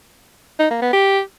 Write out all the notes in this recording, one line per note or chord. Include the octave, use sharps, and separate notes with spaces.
D#4
A#3
B3
G4